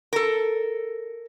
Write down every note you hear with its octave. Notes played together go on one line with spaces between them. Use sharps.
A4 A#4